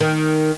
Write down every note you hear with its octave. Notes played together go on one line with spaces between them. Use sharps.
D#3